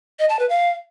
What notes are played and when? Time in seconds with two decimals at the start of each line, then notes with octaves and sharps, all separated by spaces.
0.19 D#5
0.29 A5
0.39 B4
0.49 F5